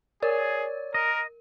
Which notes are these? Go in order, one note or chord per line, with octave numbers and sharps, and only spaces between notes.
G#4 A#4 C#5 D5
A#4 D#5